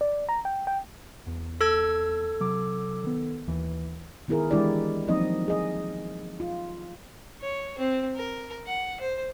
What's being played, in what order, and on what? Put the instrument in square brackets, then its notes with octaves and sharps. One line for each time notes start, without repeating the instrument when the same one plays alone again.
[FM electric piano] D5
A#5
G5
G5
[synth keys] E2
[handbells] A4 E6 G#6
[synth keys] C3 F#3 D6
D#3 B3
D#2 E3
[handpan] D#3 B3 E4 G#4 A#4
E3 G#3 D4 E4 G4 D5
F3 F#3 A#3 C4 D#4 D#5
G#4 D#5
F4
[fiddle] C#5
C4
A#4
F#5
C5